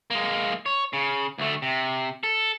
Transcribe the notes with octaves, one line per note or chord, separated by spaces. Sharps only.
G#3 A#3
C#5
C#3
D2 A3
C3
A4